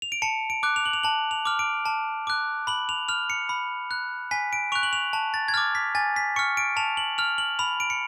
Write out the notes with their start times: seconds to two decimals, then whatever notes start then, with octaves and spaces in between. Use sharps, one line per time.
0.02 F7
0.12 D7
0.22 A5 C#7
0.50 D7
0.63 D6 F#6
0.76 F7
0.86 F#7
0.93 F7
1.03 A5 F#7
1.31 F7
1.45 D6 F6
1.59 D7
1.86 A5
2.27 D6 F#6
2.67 B5 F#7
2.89 F7
3.08 F6 F7
3.30 C#7
3.49 B5
3.91 F#6
4.31 G#5 B6
4.53 D7
4.72 C#6 F7
4.75 F#6
4.83 F#7
4.93 F7
5.13 A5
5.34 A6
5.48 G#6
5.54 F6 A6
5.57 D6
5.75 B6
5.95 G#5 A6
6.16 B6
6.36 C#6 C#7
6.39 F6
6.57 D7
6.77 A5 F7
6.97 F#7
7.18 F6 F7
7.38 F#7
7.59 B5 F7
7.80 D7
7.90 C#7